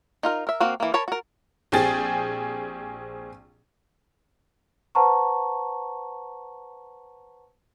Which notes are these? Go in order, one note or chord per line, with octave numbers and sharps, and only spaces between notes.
D#4 F4 A#4
A#4 E5
A#3 C4 F#4 F5
E3 A#3
A#4 C#5 A5 B5
F#4 A#4
A#1 C4 G4 G#4 A6
B4 C5 F#5 A5 A#5 C#6